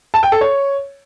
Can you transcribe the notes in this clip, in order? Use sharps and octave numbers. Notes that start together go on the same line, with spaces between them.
A5
G5
A4
C#5